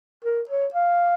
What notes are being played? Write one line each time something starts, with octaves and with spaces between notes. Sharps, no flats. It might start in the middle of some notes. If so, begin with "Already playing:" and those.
A#4
C#5
F5